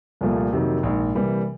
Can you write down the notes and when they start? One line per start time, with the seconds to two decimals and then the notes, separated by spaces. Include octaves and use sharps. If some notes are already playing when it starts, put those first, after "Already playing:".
0.21 C2 A#2 F3 A3
0.52 F2 C3 D#3 F#3 A#3
0.83 A#1 G#2 D#3
1.15 C3 E3 G3 A#3